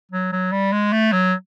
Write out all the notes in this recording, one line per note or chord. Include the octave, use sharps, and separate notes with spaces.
F#3
F#3
G3
G#3
A3
F#3